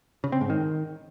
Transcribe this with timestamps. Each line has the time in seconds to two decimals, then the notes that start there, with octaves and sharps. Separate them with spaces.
0.24 C#3
0.32 C4
0.41 G#2
0.50 D#3